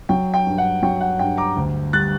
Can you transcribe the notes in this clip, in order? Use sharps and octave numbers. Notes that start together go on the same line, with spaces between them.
F#3 G5
G5
G2
F#5
F#3 G5
F#5
G2 G5
A#5 D6
D2
G3 F#6 A6